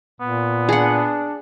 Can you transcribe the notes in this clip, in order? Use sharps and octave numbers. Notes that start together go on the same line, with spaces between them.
A#2 B3
D4 G#4 F#5